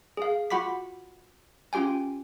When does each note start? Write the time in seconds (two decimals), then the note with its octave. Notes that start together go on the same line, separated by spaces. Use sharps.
0.17 G#4 F5
0.50 F4 F#4 F#5 B5 D6 B6
1.73 C#4 F4 G4 G5 G#5